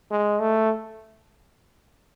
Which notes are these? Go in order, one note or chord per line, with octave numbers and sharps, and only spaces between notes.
G#3
A3